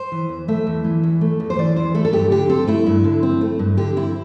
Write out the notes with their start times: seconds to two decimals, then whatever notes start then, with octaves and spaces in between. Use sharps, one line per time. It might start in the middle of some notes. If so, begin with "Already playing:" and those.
Already playing: C5
0.12 E3
0.29 E2
0.48 A3 E5
0.67 E2
0.84 E3
1.03 E2
1.21 A3
1.40 E2
1.50 C5
1.58 E3 D5
1.76 E2 C5
1.94 A3 A4
2.05 A4
2.13 G2 G4
2.31 D3 G4
2.49 C4 A4
2.67 A3 E4
2.86 G2
3.04 D3
3.23 C4
3.41 A3
3.59 G2
3.77 D3 G4
3.96 C4 E4